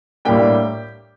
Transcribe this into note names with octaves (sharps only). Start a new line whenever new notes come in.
A2 G3 A#3 D4 G4 G5